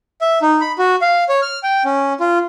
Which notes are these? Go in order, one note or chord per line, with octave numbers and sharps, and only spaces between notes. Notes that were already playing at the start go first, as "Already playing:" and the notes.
E5
D#4
B5
F#4
F5
C#5
F6
G5
C#4
F4